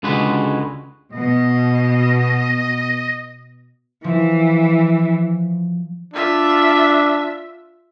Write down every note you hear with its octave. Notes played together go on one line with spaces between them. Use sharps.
C#2 D3 G#3 F#4 B4
B2 D#5
E3 F3
D4 F4 E5